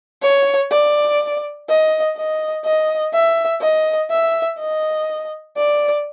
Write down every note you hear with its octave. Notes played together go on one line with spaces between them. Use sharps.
C#5
D5
D#5
D#5
D#5
E5
D#5
E5
D#5
D5